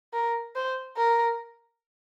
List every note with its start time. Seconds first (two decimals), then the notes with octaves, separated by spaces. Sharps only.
0.13 A#4
0.55 C5
0.97 A#4